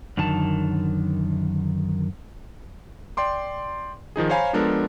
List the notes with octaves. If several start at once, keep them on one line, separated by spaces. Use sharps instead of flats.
F#2 D3 D#3 A5
D5 G5 C6 D6
D#3 F3 D#4 G#4
C5 C#5 F5 G#5 A#5 B5
F3 G#3 B3 D4 A4 A#4